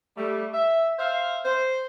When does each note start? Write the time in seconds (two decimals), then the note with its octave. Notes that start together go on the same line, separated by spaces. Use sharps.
0.17 G3 A3
0.54 E5
0.99 C5 E5 F5
1.45 C5